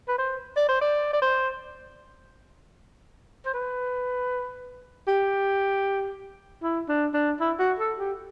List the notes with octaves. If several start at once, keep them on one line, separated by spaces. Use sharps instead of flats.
B4
C5
D5
C5
D5
D5
C5
C5
B4
G4
E4
D4
D4
E4
F#4
A4
G4